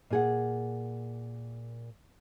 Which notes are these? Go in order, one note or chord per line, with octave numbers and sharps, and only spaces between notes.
A#2 G#4 F#5